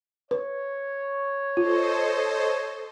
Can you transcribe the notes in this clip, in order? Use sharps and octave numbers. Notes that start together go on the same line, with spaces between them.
B4 C#5
F4 A4 C5 D#5